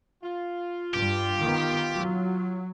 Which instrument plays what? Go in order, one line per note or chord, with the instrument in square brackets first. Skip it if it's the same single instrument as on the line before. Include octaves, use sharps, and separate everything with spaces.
[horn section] F4
[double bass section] G2 [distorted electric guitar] G4
[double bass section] D#3 B3
F#3